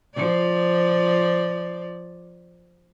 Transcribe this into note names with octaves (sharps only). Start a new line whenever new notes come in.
F3 D5